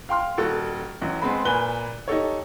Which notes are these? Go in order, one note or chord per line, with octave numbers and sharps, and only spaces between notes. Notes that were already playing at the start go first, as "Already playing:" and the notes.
F5 G5 C6 F6
D#1 F#4 A4
A1 F#3
G#3 B3 C4 B5
A#2 B4 G#5 F#6 G7
D#4 G4 A4 C#5